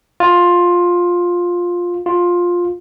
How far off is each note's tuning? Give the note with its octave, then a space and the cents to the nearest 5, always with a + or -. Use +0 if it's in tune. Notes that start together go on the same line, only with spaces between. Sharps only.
F4 +10
F4 +10